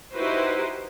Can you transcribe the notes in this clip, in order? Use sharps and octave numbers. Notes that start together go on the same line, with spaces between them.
D#4 E4 F#4 G4 B4 C5